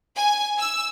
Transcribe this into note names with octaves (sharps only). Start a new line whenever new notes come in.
G#5
E6